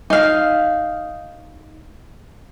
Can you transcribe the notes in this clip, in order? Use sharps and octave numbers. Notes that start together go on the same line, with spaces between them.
D#4 F5